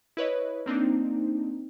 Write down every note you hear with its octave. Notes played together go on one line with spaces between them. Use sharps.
E4 B4 C#5 D#5
A#3 C4 D4 D#4